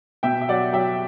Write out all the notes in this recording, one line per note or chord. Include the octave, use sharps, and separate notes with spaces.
B2 E5 G5
E5
F#3 D5 F#5
F#3 E5 G5